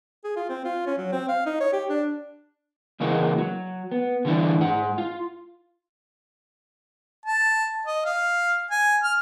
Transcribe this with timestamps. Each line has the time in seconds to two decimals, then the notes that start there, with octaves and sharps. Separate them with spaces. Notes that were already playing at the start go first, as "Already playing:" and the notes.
0.24 G#4
0.36 F4
0.49 C4
0.65 F4
0.86 C#4
0.98 F#3
1.12 C4
1.29 F5
1.46 D#4
1.60 C#5
1.73 G4
1.90 D4
3.00 C#3 E3 G#3 A#3 D#4 F#4
3.38 F#3
3.92 B3
4.25 D3 E3 G3 D4 E4
4.58 G#2 F#5
4.98 F4
7.26 A5
7.86 D#5
8.05 F5
8.71 G#5
9.03 F6